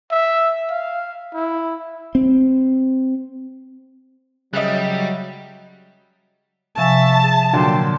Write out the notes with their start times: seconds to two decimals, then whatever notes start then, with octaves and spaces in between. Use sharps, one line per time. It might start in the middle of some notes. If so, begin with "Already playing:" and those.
0.11 E5
0.70 F5
1.34 E4
2.15 C4
4.53 C#3 F#3 G3 D#5 E5 F#6
6.77 C3 F3 E5 G#5 A5 C#6 E6
7.22 G#4
7.53 A#2 D3 F#3 G5 C6 D6